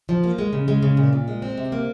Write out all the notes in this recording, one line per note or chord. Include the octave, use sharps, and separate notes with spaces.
F3
A#3
G#3
C#3
G#3
C#3
A#2
A#2
G#3
C4
C3
A#3